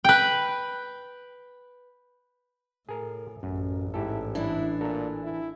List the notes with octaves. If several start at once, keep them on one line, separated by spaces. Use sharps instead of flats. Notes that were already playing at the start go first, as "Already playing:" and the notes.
B4 G5
A2 G#4 A#4
A1 F#2
G#2 E4 G4 A4
E3 D4 E4
A#2 A4 A#5
E4